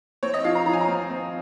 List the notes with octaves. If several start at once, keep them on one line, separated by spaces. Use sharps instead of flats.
C4 C#5
D#5
F3 F5
A#5
F3 A#5
G#5
A#5
C4
C4